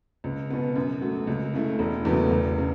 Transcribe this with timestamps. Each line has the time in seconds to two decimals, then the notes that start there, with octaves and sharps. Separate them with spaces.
0.24 C#2
0.50 B2 B3
0.76 F#2
1.02 F#3 A3
1.27 C#2
1.54 C#3 A3 E4
1.79 E1
2.05 E2 C#3 F#3 A3
2.30 E1
2.58 C#3